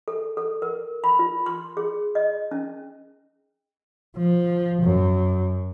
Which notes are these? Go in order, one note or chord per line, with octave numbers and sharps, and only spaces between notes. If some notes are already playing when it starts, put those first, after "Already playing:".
A4
A4
A#4
B5
F4
C6
G#4
D#5
C#4
F3
F#2